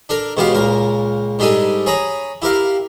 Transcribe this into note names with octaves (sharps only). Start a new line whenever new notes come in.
D4 A4 A#4
C#2 B2 B3 F#4 G4 F5
C#2 A#2 A#4
G#2 G3 D4 D#4 A4 G#5
G#4 C#5 A#5 B5 D#6
E4 G4 A#4 F5